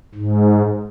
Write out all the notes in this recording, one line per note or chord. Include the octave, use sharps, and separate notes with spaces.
G#2